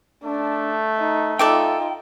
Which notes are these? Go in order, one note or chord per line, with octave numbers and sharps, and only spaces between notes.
A3 D4
D#4
D#4 F4 A4 D5 E5 G5